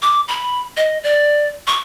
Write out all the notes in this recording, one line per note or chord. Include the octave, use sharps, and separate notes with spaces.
D6
B5
D#5
D5
C#6